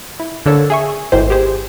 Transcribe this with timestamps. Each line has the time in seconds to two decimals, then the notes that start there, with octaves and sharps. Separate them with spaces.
0.20 E4
0.46 D3 A#3 A4 C#5 E6
0.70 G#4 E5 C#6
1.12 G#1 A2 D#3 E3 C5
1.30 G4 G#4 C5